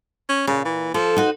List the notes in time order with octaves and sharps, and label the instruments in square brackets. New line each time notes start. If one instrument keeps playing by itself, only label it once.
[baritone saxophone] C#4
[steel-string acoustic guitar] A#2 [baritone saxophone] C#3
[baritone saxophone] E3
[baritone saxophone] F3 [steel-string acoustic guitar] A4
[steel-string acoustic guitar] D#4 F#4 C5